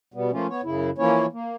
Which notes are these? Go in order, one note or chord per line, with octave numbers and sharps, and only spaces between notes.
B2 G3 B3
F3 A3 A#3 C#4 F4
B3 C#5
F#2 C#3 E4
E3 F3 A#3 C#4 E4 C#5
A#3